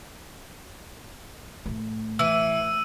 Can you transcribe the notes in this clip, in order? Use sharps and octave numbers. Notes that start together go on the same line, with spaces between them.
A2 A3
E3 E6 D#7